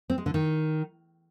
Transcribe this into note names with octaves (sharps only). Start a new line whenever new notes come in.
C4
G#3
D3
D#3